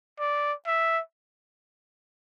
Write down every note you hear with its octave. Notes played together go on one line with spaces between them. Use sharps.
D5
E5